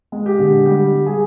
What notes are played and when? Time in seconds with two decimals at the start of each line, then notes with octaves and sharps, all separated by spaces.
0.12 G#3
0.26 G4
0.39 D3
0.66 G3 G4
0.92 G3
1.06 G#4